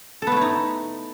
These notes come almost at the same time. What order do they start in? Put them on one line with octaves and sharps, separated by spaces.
A4 B3 A3 E4 D#4